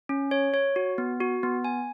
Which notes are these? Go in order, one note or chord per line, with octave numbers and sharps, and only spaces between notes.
C#4
C#5
C#5
F#4
B3
F#4
B3
G#5